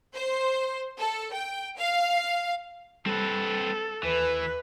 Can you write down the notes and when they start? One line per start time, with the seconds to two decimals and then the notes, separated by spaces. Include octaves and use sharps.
0.14 C5
0.99 A4
1.34 G5
1.77 F5
3.06 G3 C4 A4 B4
4.03 D#2 E3 B4